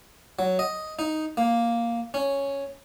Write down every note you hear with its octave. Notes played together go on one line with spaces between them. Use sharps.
F#3
D#5
D#4
A#3
C#4